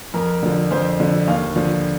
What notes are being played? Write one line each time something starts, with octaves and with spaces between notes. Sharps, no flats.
F2 A#4
D3 F3
F2 C5
D3 F3
D#2 F5
D3 F3